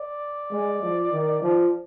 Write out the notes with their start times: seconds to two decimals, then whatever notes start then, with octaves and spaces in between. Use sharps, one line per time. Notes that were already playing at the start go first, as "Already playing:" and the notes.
Already playing: D5
0.52 G#3
0.82 F3
1.12 D#3
1.42 F3